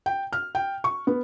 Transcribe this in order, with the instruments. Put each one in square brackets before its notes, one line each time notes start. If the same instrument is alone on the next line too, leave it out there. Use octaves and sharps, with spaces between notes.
[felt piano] G5
F6
G5
C#6
B3